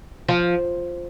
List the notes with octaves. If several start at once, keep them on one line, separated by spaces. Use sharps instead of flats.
F3